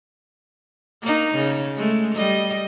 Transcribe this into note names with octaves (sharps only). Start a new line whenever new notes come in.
A#3 D#4
C#3
G#3 A3
G3 D#5